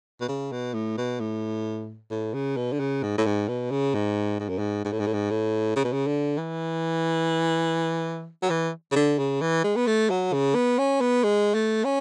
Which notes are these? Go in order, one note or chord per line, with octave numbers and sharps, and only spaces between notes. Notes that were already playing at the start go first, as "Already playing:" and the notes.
B2
C#3
B2
A2
B2
A2
A2
C#3
B2
D3
C#3
G#2
A2
G#2
B2
C#3
G#2
G#2
F#2
G#2
G#2
A2
G#2
A2
G#2
A2
C#3
B2
C#3
D3
E3
F#3
E3
C#3
D3
C#3
E3
G#3
B3
A3
F#3
C#3
B3
C#4
B3
G#3
A3
C#4